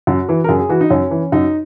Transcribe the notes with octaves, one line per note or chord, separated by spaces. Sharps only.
F#2 F#4
E3
A#4
F#2 G#4
G#4
E3 F#4
D#4
F#2 C#4
E3
F#2 D#4